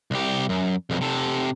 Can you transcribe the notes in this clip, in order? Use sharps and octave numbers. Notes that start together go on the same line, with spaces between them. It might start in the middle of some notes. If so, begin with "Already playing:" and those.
C2 G4
F#2
B1 F2
C3 A4